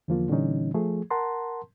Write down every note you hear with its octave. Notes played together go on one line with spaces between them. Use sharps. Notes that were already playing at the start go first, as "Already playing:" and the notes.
E2 D3 F3 A#3 F4
A#2 D3 E3 G3 C#4 D#4
F3 A3 G#4
A#4 F#5 A5 A#5 C6